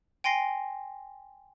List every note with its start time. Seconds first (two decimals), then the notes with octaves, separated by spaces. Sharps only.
0.24 G5 G#5 C6 A#6 C7